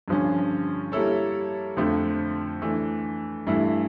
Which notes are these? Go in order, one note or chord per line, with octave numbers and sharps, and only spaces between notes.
G2 D3 F3 C#4
G3 A#3 E4 A4 C#5
F2 D3 F3 A3
E3 A3 D4
G2 E3 A3 E4